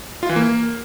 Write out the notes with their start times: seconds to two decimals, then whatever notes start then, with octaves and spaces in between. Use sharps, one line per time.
0.23 F4
0.29 E3
0.36 A#3